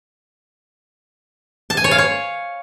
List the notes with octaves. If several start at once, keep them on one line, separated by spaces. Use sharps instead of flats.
A5
G#5
C#5
F5
C#5